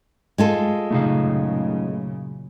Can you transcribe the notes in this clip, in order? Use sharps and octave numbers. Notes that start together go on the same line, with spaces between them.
G#3 F4 A4
F#2 A#2 C#3 A3 D#4 F5